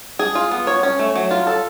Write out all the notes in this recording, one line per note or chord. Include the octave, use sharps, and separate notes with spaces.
G#4
F4
B3
C#5
C#4
A3
F#3
F4
A4